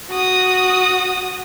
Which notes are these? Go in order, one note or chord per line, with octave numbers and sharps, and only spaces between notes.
F#4 D#6